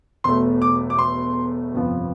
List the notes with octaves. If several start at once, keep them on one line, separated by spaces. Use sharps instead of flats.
E1 E2 B2 A3 C6
D6
D6
C6
G1 F2 C3 F3 B3